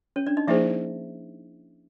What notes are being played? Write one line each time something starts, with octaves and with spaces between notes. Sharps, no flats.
C#4 C#5
D4 D5
D#4 D#5
F3 A#3 D#4 E4 G#4 C5 E5